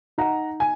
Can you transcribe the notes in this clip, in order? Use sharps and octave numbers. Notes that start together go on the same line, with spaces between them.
D#4 F#5 A#5
G#5